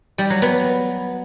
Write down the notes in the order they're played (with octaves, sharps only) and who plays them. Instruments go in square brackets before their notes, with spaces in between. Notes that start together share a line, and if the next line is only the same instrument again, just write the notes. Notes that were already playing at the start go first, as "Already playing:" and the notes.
[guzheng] G3
F#3
B3